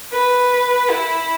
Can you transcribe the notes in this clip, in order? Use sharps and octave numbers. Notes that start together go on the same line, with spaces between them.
B4
E4